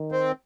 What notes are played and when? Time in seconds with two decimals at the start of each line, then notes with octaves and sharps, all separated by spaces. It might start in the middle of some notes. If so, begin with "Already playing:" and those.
Already playing: D#3
0.12 C4